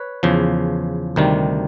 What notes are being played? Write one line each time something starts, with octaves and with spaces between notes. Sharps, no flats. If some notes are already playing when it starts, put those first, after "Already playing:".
Already playing: B4 C#5
E2 C#3 F3
D2 C3 D#3 G3